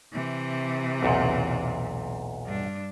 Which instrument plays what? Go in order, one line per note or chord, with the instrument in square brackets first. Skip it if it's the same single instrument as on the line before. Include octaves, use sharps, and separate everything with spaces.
[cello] C3 E3
[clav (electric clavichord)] B1 E2 A#2
[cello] G2 D4